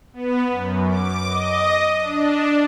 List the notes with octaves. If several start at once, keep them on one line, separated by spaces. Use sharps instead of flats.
B3
F#2
D6
D#5
D4